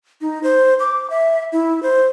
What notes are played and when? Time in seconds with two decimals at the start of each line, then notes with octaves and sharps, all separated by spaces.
0.21 D#4
0.43 C5
0.80 D6
1.10 E5
1.52 E4
1.83 C5